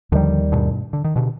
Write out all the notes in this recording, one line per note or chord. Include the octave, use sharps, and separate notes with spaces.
D#2 D3 D#3 F3 G3
G2 B2
D3
D#3
B2 D3